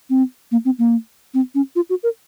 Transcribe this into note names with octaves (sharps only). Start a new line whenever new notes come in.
C4
A#3
C4
A#3
C4
C#4
F4
F#4
A#4